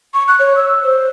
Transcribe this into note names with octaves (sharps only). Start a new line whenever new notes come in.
C#6
F#6
C#5
E6
C5